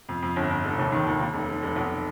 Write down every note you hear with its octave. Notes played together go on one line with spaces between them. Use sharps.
F2
F2
G1
G1
F1
D#2
D#3
D#2
D#2
F1
F1
F1
B1